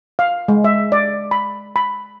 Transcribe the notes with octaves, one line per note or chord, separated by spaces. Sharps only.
F5
G#3
E5
D5
B5
B5